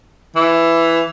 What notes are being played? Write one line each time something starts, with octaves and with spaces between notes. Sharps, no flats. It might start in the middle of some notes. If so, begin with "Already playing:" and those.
E3